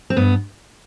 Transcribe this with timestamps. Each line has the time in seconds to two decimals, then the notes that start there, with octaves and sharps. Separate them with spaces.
0.10 C4
0.17 G2 B3